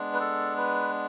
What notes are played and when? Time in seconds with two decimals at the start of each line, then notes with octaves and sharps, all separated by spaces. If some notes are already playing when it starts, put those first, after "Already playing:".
Already playing: G#3 B3 D4
0.14 B4
0.20 A4
0.58 B4